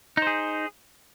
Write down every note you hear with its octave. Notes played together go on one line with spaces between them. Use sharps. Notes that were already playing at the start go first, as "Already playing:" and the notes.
D#4 G#4 C5